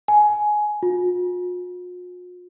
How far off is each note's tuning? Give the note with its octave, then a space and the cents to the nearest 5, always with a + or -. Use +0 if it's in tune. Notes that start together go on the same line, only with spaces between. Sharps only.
G#5 +15
F4 +45